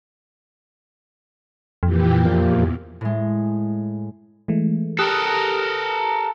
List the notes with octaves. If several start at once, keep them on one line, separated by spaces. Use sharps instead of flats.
F2 A#2 E3 G4
E2 A#2 F3
A2 G#3
E3 G#3 A3
G4 A4 A#4 D#6 F#6